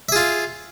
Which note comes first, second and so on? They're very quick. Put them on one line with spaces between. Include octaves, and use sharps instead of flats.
E5 G#4 F4